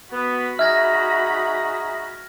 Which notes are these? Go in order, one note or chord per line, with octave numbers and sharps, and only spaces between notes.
B3 F#4 B5
D#4 G#4 E5 A#5 F6 G#6 A#6